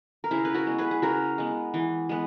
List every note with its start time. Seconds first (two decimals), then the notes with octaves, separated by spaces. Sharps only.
0.24 A#4
0.31 C#3 E4 G#4
0.45 B4
0.54 F#4 A#4
0.67 G#3 B3
0.78 G#4 B4
0.91 G#4
1.02 C#3 F#4 A#4
1.38 G#3 B3
1.74 E3
2.09 G#3 B3